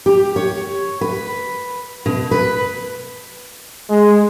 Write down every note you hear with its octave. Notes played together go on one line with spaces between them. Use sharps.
G4
C#5
B4
B2
B4
G#3